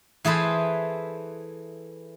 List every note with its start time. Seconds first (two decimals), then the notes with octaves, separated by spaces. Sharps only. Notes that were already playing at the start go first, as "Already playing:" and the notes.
0.25 E3 G#4 A4 B4 C5